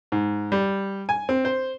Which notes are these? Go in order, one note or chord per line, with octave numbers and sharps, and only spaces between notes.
G#2
G3
G#5
C4
C5